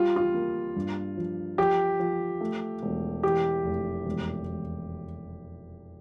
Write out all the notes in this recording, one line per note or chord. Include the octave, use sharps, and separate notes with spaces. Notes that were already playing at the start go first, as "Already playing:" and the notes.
Already playing: G3 F4
F4
A#3
G2
F3
F3 G4
F3
A3
E1
E3 G4
F1
E1
E1